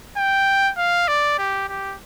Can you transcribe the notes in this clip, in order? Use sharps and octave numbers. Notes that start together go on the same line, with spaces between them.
G5
F5
D5
G4
G4